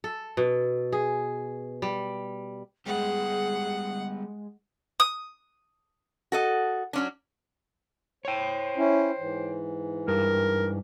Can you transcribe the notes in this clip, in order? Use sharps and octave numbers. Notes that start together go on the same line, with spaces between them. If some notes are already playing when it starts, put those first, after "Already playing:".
A4
B2
G#4
G3
G3 G#3 B3 G4 G#4 F#5
D#6
F#4 A4 D#5
F#3 C#4 D4
C5 C#5 G5
C#4 E4
G#2 E3
G2 A#4